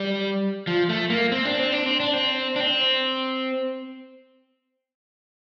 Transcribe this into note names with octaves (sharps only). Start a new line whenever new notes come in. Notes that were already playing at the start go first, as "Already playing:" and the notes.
Already playing: G3
F3
A3
A#3
C4
D4
C4
D4
C4
D4
C4
D4
C4